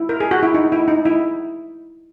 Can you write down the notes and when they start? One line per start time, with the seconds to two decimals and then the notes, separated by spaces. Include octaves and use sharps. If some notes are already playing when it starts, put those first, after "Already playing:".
Already playing: E4
0.09 A#4
0.20 G#4
0.31 F#4
0.43 E4
0.54 D#4
0.72 E4
0.88 D#4
1.05 E4